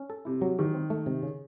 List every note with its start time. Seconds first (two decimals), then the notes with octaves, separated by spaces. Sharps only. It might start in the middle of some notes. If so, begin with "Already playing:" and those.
Already playing: C#4
0.10 A4
0.25 C3 E4
0.41 F#3
0.58 D#3 E3
0.74 C4
0.90 A3
1.06 C3
1.23 C#3